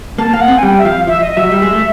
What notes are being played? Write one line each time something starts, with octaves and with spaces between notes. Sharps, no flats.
A#3 A5
A#3 F5
F#5
C4
G#5
G3 G5
E5
F3 F5
F3 E5
D#5
D#5
F#3 E5
G3
G#3
A3